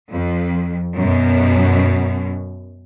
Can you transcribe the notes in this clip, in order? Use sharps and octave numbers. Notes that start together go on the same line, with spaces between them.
F2
F#2 B2